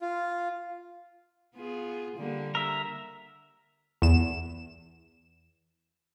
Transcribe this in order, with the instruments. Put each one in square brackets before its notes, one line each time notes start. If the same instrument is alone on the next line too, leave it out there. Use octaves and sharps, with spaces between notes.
[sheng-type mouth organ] F4
[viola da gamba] B3 F4 G#4
D3 G3 A#3
[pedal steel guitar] A#4 E5
[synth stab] E2 E7